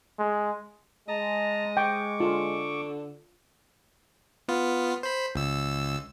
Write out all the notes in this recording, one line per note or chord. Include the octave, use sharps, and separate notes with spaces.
G#3
G#3 D#5 A5 A#5
G5 C#6 D6
D3 F4
B3 F4
C5 B5
C#2 E6